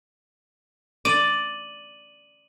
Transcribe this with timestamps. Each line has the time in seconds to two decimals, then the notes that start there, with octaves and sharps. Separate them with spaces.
1.05 D5 D#7 F#7